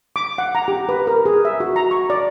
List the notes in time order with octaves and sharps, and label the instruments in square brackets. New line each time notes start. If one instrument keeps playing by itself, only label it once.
[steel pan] D6
F#5
A#5
G4
B4
A#4
G#4
E5
F#4
A#5
C#6
D5